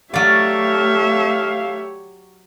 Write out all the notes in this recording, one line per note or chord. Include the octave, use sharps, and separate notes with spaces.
F#3 A3 G4 C#5 D5 E5 F5